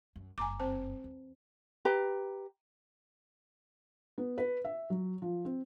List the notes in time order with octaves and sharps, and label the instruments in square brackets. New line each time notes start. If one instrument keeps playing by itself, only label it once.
[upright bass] F#2
[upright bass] F#1 G2 [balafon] G#5 A#5 D6
[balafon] C4 C5 A5
[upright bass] E2
[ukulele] G4 B4 A#5
[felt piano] B3
B4
E5
F#3
F3
C4